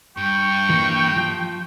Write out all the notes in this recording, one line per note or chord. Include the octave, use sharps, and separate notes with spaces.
G2 G5 C#6
E3 G3 A#3
F3